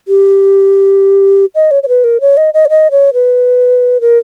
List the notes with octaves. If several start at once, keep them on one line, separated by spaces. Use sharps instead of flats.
G4
D#5
C#5
C#5
B4
A#4
C#5
D#5
D#5
C#5
D#5
C#5
B4
A#4